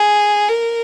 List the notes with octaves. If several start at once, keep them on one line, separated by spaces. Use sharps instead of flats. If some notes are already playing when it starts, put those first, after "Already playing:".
Already playing: G#4
A#4